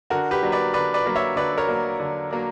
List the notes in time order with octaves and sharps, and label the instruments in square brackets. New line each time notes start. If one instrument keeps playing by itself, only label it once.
[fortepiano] D3 F#4 A#4
G4 B4
F#3 A#3 D4
B4 D5
D3 B4 D5
B4 D5
F#3 A#3 D4
C#5 E5
D3 B4 D5
A#4 C#5
F#3 A#3 D4
D3
F#3 A#3 D4